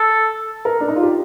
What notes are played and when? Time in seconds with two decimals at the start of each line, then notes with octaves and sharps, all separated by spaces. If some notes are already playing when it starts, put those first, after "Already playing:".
Already playing: A4
0.65 A#4
0.80 D4
0.88 D#4
0.95 F4
1.03 G4